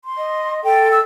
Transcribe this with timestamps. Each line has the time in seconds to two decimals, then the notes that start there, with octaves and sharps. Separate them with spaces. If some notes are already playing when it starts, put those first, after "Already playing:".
0.05 C6
0.18 D#5
0.64 A4 G5
0.92 E6